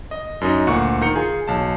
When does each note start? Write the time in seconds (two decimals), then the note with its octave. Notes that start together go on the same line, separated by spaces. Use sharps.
0.11 D#5
0.41 F#2 D#4 D#5
0.67 D2 A#2 F#5 C#6 C#7
1.01 D#3 A#5 G6 C#7
1.16 F4 G#4
1.48 B1 A5